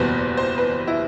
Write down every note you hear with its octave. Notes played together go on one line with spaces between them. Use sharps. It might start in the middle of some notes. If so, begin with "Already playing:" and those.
Already playing: F#1 E2 B2 G3 B4 C5
C5
B4
E4